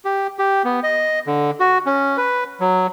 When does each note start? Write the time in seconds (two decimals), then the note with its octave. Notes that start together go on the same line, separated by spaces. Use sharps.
0.05 G4
0.39 G4
0.65 B3
0.83 D#5
1.27 D3
1.60 F#4
1.86 C#4
2.17 B4
2.60 F#3